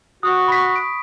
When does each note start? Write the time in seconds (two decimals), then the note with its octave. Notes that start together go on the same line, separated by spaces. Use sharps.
0.23 F#4 D#6
0.48 B5 C#6 B6
0.76 D7